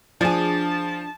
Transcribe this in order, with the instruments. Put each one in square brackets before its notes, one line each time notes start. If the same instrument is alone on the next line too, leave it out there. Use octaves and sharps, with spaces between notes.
[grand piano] F3 [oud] D4 G#4 [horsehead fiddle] A5